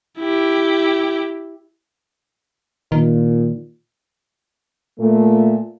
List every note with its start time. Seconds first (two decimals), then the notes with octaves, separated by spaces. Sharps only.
0.19 E4 G4
2.92 A#2 D#3
4.99 A#2 A3